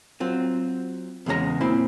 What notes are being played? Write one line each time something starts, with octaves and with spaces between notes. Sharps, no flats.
F#3 C4 F4
E2 C#3 G#3 C#4 A#5
A#2 C4 E4